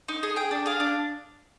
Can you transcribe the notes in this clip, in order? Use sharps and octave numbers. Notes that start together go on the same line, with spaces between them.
D#4
G#4
G#4 G5
D4
G#4 F5
D4